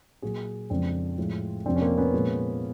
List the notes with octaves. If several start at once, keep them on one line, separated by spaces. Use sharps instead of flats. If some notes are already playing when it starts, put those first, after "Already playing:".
A#2 F#3 F#4 G#4
F2 C#3 F3 G#3 C4 D4
A2 F3 G#3
F2 C3 F3 C4 D4
C#4
A#3 C4
B3 C#4
A#2 F3 G#3